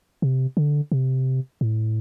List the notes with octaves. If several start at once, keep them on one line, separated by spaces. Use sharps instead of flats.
C3
D3
C3
A2